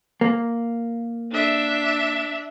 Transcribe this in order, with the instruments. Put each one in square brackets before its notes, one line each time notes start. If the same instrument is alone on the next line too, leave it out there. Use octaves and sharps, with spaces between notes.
[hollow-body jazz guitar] A#3
[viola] D4 E5